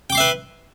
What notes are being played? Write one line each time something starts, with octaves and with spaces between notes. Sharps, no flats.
B4 E5 G5 C6 D6